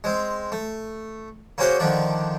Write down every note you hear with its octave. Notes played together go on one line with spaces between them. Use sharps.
G#3 C4
A3
A#3 C4 C#4 F#4 G#4 C5
D3 D#3 F3 D4